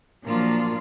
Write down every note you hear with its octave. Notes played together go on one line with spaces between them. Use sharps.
A#2 F3 F#3 A#3 D4 F4